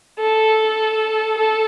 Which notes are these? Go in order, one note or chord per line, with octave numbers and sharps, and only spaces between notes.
A4
A4